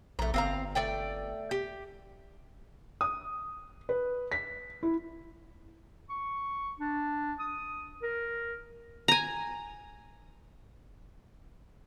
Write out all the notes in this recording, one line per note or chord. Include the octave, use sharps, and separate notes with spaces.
A#1 A3 A#5
G1 C4 F5 A#5
A3 D5 G5
G4
D#6
B4
B6
E4
C#6
D4
D#6
A#4
G#5 A#5